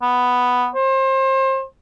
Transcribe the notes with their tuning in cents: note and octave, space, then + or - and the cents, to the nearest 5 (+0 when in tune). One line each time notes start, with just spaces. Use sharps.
B3 +5
C5 +30